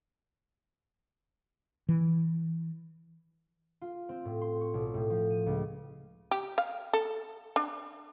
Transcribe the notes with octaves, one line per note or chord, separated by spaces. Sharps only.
E3
F4
C4
A2
C6
C#6
B1
A2
F3
D#7
C#2
G4
F5
A4
D4